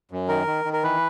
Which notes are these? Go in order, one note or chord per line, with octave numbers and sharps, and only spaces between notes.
F#2
D#3 A#4
D#3
D#3
A#4
E3 B4